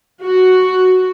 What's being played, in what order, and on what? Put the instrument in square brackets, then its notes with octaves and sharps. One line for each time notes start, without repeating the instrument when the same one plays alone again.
[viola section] F#4